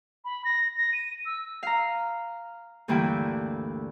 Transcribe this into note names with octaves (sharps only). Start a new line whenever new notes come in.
B5
A#6
A#6
D#7
E6
F5 A#5
D2 G2 E3 A#3 E4 G5